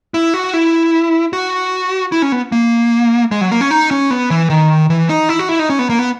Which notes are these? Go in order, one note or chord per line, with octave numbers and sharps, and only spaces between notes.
E4
F#4
E4
F#4
E4
C#4
B3
A#3
G#3
F#3
A#3
C#4
D#4
C#4
B3
E3
D#3
E3
D#4
E4
F#4
E4
D#4
C#4
B3
A#3
B3